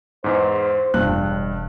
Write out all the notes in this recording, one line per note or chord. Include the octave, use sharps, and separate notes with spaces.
E2 G#2 C5
E1 G2 F#6